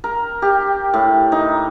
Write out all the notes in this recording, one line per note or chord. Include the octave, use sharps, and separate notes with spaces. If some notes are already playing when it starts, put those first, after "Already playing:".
A#4
G4
A2
D#4